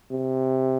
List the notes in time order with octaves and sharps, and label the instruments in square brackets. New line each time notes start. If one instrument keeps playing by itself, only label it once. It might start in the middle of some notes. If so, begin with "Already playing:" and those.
[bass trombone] C3